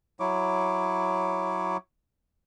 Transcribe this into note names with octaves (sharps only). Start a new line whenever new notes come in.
F#3 E4 C#5 D6